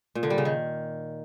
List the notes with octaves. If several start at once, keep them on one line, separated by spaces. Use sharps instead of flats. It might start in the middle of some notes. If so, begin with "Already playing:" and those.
A#2
D3
G3
C#3
D#3